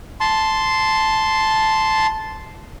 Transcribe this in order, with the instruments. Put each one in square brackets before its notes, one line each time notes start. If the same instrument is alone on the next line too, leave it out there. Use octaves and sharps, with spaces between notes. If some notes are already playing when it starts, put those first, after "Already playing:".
[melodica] A5 C6